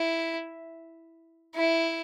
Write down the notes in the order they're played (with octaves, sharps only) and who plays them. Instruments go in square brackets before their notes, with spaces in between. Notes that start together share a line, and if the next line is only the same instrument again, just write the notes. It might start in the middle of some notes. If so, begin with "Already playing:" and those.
Already playing: [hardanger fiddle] E4
E4